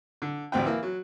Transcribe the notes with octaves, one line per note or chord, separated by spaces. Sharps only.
D3
A1 D2 C4 G5
E3 A#3
F#3